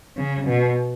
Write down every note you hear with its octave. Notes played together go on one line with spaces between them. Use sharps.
C#3
B2